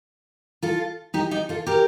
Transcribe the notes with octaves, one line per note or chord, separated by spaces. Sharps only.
F4 A4
D#4 G4
D#4 G4
F4 A4
G4 A#4